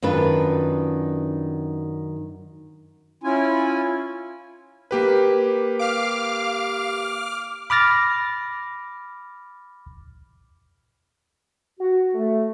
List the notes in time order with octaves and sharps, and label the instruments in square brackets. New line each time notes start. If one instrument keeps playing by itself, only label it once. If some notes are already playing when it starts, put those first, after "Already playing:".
[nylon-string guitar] F#2 D#3 D4 F4 B4
[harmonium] C#4 E4 F4 G#5
[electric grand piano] A#3 G4 B4
[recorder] F5 [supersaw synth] D6 F6
[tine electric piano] B5 D6 F6 A6 A#6
[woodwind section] F#4
A3